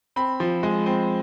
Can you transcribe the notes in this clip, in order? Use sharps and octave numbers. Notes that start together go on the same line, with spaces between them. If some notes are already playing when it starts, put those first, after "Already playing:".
C4 B5
F3
G#3
C4